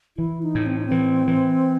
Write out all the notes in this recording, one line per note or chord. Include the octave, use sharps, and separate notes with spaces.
E3 E4
D#4
A2
C4
D#4
C4
E3
E3